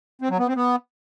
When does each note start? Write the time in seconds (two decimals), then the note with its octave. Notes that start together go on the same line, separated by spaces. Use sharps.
0.22 C4
0.30 F#3
0.39 B3
0.47 C4
0.56 B3